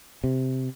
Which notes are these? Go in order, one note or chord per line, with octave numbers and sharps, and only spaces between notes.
C3